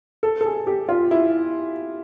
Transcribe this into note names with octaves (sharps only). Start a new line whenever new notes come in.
A4
A4
G#4
G4
F4
E4